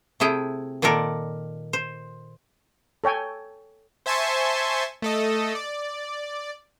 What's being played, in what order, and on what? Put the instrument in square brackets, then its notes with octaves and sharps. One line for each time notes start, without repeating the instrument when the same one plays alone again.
[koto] C3 A3 E4 G#4 G5
A#2 D#3 F4 A4 A#4 D5
C5
[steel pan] A4 C#5 G5 G#5
[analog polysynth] C5 E5 G#5 A5 C6 C#6
A3 A4 D#5
D5